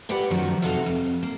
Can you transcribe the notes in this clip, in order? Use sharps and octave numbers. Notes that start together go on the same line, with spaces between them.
F4 G4 B4 D5 F#5
F#2 D#3 F3 A3 F#4
F2 C3 D#4 F#4 A4 F5
F2
A#3